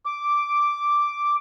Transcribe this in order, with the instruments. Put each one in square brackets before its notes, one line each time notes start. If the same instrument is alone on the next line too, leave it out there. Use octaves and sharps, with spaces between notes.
[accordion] D6